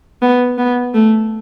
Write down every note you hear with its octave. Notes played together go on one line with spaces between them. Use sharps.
B3
B3
A3